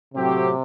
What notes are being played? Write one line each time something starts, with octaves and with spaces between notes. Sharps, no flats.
A2 C3 F#3 C4 G4